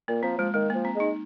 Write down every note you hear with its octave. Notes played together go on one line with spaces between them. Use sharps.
A#2 A#3
F3 C4
F3 G#3
D#3 G#3
A#3
F3
C4
G#3 D#4